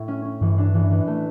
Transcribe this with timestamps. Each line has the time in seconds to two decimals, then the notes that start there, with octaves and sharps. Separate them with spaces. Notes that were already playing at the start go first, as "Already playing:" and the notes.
Already playing: A2 E4
0.08 C#4
0.25 C#4
0.41 G2 E3
0.58 D4
0.74 E3
0.91 E3
1.07 A3